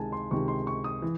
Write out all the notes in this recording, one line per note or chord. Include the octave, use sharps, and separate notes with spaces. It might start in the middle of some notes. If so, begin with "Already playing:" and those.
Already playing: C#2 C3 D#3 G#3 G#5 A5
C6
C#2 C3 D#3 G#3 C#6
C6
C#6
D#6
E3